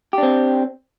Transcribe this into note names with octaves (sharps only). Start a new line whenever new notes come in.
C4 D4 G4